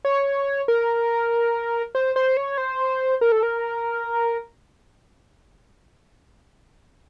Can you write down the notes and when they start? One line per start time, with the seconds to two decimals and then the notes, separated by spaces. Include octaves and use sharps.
0.05 C#5
0.68 A#4
1.95 C5
2.16 C5
2.37 C#5
2.58 C5
3.21 A#4
3.32 A4
3.43 A#4